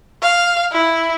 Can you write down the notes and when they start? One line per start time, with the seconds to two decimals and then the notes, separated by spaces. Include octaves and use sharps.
0.23 F5
0.72 E4